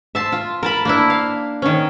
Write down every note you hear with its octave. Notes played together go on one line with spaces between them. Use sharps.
E5 A5 C6
F4
A#4 A5 B5
A#3 D4 E4
F5
D#3 C#4